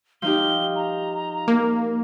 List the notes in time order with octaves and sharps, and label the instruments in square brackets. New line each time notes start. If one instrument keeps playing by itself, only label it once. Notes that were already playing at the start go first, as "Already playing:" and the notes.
[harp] F3 D#4 G4 [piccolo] G7
[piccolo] A#5
[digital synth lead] A#3